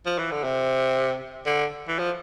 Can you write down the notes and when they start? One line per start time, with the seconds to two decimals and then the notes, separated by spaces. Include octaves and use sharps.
0.06 F3
0.18 E3
0.31 D3
0.44 C3
1.46 D3
1.88 E3
1.98 F3